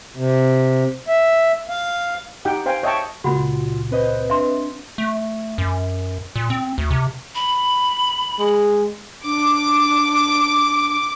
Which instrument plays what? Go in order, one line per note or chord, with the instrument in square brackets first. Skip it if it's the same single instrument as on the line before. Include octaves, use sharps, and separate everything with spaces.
[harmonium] C3
E5
F5
[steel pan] D#4 G4 F#5 G5
C5 F5 G5 G#5
C#5 D#5 E5 G5 A5 C#6
[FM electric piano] C#2 A#2 [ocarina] F4 [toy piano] F#4 F#5 B5
[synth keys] C4 B4 D#5 [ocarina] C5
[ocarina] D4 [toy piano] E5 C6
[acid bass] A3
F#2
A#2
C4
D2
C3
[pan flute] B5
[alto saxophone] G#3
[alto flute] D4 [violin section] D6